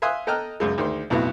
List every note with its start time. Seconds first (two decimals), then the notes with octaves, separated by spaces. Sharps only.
0.02 E5 F5 G#5 C6 D#6 F#6
0.27 A4 D#5 G5 A#5 F6 F#6
0.60 C#2 F#2 G#3
0.78 D2 D#3 G#3 C6
1.10 B1 F2 A2 B3 E4 F#4